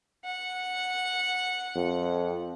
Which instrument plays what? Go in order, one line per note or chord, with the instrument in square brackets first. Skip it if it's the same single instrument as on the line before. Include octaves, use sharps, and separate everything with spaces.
[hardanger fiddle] F#5
[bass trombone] F2